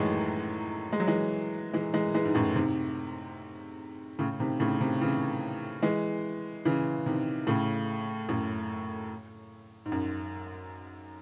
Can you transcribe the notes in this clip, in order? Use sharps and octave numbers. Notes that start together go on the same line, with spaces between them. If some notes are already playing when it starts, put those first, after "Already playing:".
Already playing: F#2 A2 D#3 E3 F#3 G#3
G#3
F#3
E3 G#3
E3 G#3
E3 G#3
E3 G#3
G#2
F#2 A2
G#2 C3
A2 C#3
C3 D#3
A2 C#3
C3 D#3
C#3 E3
E3 G#3
C#3 E3
C3 D#3
A2 C#3
F#2 A2
G#2
F#2